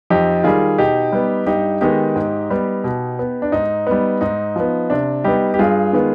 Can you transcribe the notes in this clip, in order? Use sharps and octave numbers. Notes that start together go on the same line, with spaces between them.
F2 D#4 G4
D#3 G3 F4 G#4
B2 D#4 G4
G3 B3
G2 D#4 G4
D#3 G#3 B3 D#4 G4
G#2
G3 B3
B2
B3
D4
G#2 D#4
G3 B3
G#2 D#4
F3 B3
C3 D4
G3 B3 D#4 G4
G4
G2 F4 G#4
D#3 G#3 B3